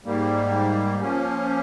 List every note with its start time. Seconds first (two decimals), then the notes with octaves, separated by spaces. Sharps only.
0.05 G#2 G3 A#3
1.00 F3 A#3 C#4